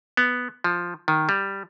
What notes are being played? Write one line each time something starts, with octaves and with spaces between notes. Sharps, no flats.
B3
F3
D#3
G3